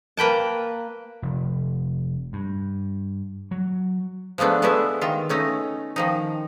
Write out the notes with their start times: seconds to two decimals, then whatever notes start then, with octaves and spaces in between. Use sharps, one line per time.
0.17 A#3 B4 G5 A5
1.22 F1
2.33 G2
3.51 F#3
4.38 F3 G#3 A3 B3 D4
4.62 G#3 A3 B3 D4 E4 E5
5.01 D#3 F4
5.29 A3 C#4 D#4
5.96 D#3 F3 D#4